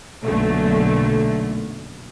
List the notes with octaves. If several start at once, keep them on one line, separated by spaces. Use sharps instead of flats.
B1 F#2 A#2 D3 A3